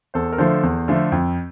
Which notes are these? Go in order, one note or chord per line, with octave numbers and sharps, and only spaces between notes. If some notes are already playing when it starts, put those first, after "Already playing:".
E2 A4 C5
A#4
D3 F3 A3 A4 C5
E2
D3 F3 A3
F2